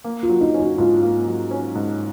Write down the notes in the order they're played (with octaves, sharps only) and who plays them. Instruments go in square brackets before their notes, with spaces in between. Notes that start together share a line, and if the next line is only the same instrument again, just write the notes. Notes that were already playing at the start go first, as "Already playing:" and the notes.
[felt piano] A#3
[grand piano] F4
[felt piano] F#3
[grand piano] D#4
[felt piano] C#4
[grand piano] F#4
[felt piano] G#2 [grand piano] F4
[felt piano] A#3
F#3
C#4
G#2